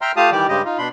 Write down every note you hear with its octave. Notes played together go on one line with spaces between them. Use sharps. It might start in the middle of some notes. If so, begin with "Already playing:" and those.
E5 G5 A#5 C6 F6
A3 F4 G4 F5 A5 D#6
D#3 E3 G3 G4 D5
G2 C#3 G3 G#3 G4 D#5
D#4 F4
B2 D4 B5 C6